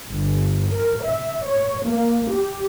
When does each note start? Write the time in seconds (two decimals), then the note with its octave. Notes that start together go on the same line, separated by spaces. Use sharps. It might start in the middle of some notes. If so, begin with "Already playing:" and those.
0.11 G1
0.71 A#4
1.04 E5
1.44 C#5
1.87 A#3
2.32 G4